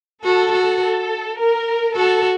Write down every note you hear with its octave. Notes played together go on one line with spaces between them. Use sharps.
F#4 A4
F#4
A4
A#4
F#4 A4